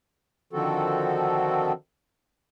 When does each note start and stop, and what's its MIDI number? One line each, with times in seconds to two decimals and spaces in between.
0.53 1.72 50
0.53 1.72 51
0.53 1.72 53
0.53 1.72 60
0.53 1.72 66
0.53 1.72 69